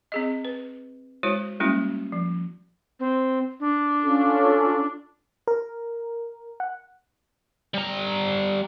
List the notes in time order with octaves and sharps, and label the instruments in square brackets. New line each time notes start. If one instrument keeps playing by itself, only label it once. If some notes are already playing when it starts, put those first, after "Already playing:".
[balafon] C4 G#4 D#5
B4
G#3 E4 F#4 C5 C#5
G3 G#3 A#3 C#4 E4 F#4
F3
[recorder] C4
D4
[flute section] C#4 F4 A4
[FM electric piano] A#4
F#5
[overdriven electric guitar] G3 A#5